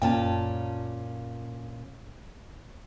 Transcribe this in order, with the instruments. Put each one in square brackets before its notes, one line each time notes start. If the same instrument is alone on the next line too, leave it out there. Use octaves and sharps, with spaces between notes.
[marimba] F#2 [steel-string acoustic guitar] A#2 C#4 A5